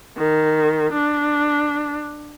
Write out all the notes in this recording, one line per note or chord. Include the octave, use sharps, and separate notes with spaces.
D#3
D4